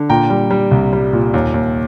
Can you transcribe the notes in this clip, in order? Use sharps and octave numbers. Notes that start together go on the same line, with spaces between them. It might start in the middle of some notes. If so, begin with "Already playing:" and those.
Already playing: D3
A#2 G5 A#5
G3
G3
C2
G3
A#2
D#2
D#2